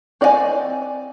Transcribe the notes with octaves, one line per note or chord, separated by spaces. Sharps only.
C4 D5 D#5 F5 G#5